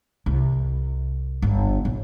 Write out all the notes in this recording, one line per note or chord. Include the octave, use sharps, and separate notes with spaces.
C2
G1
A#1